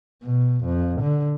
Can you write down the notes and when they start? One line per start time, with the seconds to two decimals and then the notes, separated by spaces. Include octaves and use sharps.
0.23 B2
0.65 F2
1.02 D3